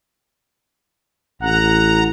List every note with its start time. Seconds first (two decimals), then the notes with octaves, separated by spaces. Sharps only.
1.42 A1 F#5 A#5